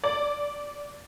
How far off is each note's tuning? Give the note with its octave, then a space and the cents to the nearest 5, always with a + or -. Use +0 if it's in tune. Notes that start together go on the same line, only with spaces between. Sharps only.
D5 -15